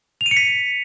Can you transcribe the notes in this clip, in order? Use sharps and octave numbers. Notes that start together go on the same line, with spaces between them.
F7
D#7
C#7
B6